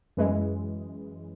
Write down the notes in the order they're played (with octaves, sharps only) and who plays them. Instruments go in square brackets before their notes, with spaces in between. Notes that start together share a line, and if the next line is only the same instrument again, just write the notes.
[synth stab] F#2 E3 G#3